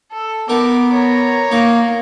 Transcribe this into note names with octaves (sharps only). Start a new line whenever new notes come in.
A4
B3 D#4 A#4 D6
C#5 A#5
A#3 D#4 A#4